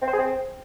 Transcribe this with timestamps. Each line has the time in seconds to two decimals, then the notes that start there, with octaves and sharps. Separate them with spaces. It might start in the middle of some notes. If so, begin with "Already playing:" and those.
0.02 C4
0.07 C5
0.13 G#4
0.18 C4